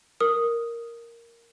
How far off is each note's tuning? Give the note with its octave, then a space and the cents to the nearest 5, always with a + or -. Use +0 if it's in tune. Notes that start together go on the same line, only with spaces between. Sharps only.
A#4 +0 D#6 +0